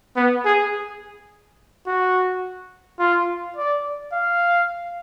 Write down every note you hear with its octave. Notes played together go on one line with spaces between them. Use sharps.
B3
G#4
F#4
F4
D5
F5